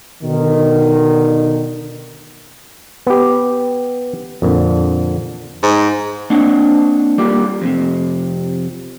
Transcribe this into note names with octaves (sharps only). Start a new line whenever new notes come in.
B2 D3 D#3
B3 G4
F2 A#2 D3
G#2
A#3 C4 D4 D#5 F#5
G3 A#3 F4 F#4 D5
F2 C3